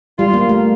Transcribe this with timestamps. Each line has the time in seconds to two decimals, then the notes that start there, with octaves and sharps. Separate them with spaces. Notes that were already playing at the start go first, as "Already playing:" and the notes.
0.18 G3 F4
0.33 A#3
0.49 A3